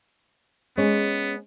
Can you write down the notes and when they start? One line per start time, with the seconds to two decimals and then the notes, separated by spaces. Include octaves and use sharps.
0.77 G#3 B3 C#4